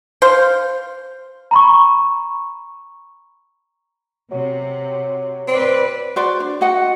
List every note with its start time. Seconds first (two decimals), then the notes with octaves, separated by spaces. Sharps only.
0.22 C5 F5
1.51 A#5 B5 C#6
4.31 C3 F#3
5.48 C4 B4 D5
6.16 F#4 C5 D5
6.40 D4
6.61 F#4 D#5 F#5